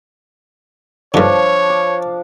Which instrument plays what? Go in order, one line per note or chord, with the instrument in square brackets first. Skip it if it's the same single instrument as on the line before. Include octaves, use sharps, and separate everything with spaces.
[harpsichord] G2 D3 [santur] F3 D4 F5 [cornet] C#5
[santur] D6